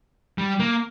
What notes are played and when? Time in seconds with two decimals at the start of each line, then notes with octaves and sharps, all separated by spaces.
0.38 G3
0.60 A#3